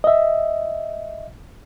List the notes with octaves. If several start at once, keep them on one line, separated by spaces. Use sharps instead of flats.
D#5 E5